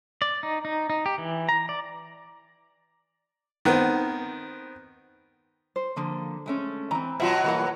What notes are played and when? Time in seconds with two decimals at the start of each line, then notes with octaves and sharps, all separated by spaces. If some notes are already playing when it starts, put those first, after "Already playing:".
0.22 D5
0.43 D#4
0.65 D#4
0.90 D#4
1.06 G4
1.18 E3
1.49 A#5
1.69 D5
3.65 D#3 B3 C4
5.76 C5
5.96 D3 F3 A#3
6.46 G#3 A3 C#4
6.91 E3 C4 A#5
7.20 B2 F#3 F4 E5
7.44 E3 G3 A#3 F#4 B4 F#5